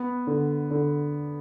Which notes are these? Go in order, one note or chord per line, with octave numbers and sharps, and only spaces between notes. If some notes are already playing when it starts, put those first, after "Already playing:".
Already playing: B3
D3
D3